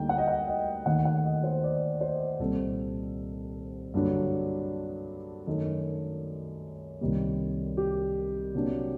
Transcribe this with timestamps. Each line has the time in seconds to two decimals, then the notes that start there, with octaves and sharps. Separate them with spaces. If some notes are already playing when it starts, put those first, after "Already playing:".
Already playing: D2 D3 G3 A#3 D#4 G5
0.09 F#5
0.18 D#5
0.28 F#5
0.48 D#5
0.86 D#2 D#3 A3 F#5
1.05 F#5
1.25 D#5
1.43 C5
1.64 D5
2.01 C5
2.39 C2 A#2 G3 C4 A4
3.94 G2 D3 F#3 A#3 D4
5.46 F#2 D#3 A3 D#4 A4
7.01 C2 C3 D#3 G3 A#3
7.77 G4
8.54 C3 F#3 A#3 D4